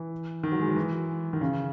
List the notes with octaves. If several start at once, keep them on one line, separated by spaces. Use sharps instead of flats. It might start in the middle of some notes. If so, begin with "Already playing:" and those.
Already playing: E3
D#3
F#3
G#3
F#3
E3
D#3
C#3